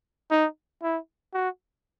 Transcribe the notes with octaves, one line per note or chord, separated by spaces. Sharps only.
D#4
E4
F#4